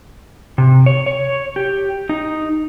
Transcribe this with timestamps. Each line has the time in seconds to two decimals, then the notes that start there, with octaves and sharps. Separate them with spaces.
0.58 C3
0.86 C#5
1.06 C#5
1.56 G4
2.09 D#4